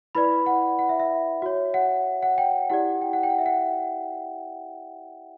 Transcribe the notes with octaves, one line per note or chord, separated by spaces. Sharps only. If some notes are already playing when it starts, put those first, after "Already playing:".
E4 B4 D5 B5
F#5
F#5
E5
E5
F#4 C#5
F#5
F#5
G5
E4 G4 D5 F#5
G5
F#5
G5
F#5
E5
F#5